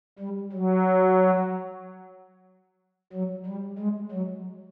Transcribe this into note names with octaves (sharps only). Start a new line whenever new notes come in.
G3
F#3
F#3
G3
G#3
F#3